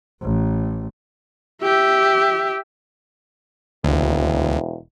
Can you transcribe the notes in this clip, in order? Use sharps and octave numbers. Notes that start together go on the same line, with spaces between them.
A1
G4 E5
E1 D2